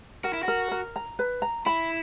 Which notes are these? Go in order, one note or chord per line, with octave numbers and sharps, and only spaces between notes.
F#4 A#4
E4
F#4 A#4
A#4
A#5
B4
A#5
E4 B5